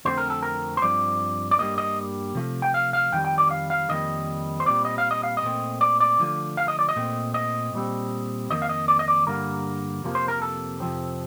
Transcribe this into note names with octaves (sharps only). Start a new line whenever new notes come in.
F2 D3 A3 C4 C5
A#4
A4
A#4
C5
G2 F3 C4 D5
D5
G2 D#3 G3 A#3 D#5
D#5
C3 F3 A3
G5
F5
F5
F2 D#3 G3 G5
G5
D5
F5
F5
F2 D#3 G3 A#3 D#5
C5
A#2 G3 C4 D5
D#5
F5
D#5
F5
D#5
A#2 A3 C4
D5
D5
D3 F3 A3
F5
D#5
D5
D#5
A#2 A3 C4
D#5
A#2 G3 C4
F2 D#3 A#3 D#5
F5
D#5
D5
D#5
D5
G2 D3 G3 A#3 A#4
F2 C3 F3 A#3
C5
A#4
A4
F2 C3 F3 C4